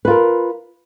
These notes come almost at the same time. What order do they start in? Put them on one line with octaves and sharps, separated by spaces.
B4 F4 A#4